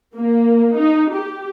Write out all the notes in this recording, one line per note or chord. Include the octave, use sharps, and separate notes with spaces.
A#3
D#4
G4